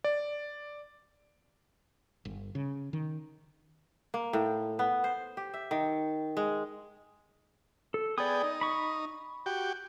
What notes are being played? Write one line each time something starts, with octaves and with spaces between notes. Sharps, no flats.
D5
G1
C#3
D#3
A#3
A2
B3
C5
G4
E5
D#3
G#3
A4
B3 G#4 D5 G5 D#6
D#4
B5 C#6
F#4 G4 G5